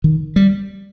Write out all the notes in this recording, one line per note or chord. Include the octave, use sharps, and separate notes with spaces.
D#3
G3